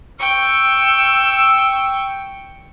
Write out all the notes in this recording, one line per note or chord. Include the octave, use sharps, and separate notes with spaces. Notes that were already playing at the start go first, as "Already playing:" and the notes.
G5 C#6 E6